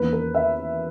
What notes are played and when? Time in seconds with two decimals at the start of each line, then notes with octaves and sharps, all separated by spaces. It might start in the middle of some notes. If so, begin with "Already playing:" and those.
Already playing: E2 D#3 A#3 B4
0.13 A#4
0.35 E5